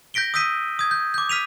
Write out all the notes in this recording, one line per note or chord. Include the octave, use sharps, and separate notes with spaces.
G6 A#6 B6 D7 G7
D#6 E6 G6 B6 D#7
D#6 G#6
G6
D6 G6
F6 B6 D#7 F7